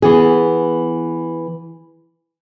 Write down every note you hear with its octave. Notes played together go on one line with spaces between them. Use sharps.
E3 B3 G#4